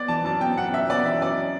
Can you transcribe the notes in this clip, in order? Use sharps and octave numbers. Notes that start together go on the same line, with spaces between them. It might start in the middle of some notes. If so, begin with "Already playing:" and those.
Already playing: B3 D5
E3 A5
F#2 A5
B3 G5
F#2 F#5
F#2 E5
B3 D5
E3 E5
F#2 D5